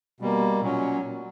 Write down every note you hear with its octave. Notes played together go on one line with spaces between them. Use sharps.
B2 G3 A#3
A#2 F#3 C#4